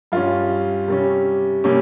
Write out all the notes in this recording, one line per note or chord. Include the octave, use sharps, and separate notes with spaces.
G2 G3 C#4 F4
C3 G3 C#4
C3 G3 A#3 C#4